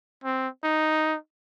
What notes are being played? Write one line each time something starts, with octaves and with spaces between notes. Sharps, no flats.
C4
D#4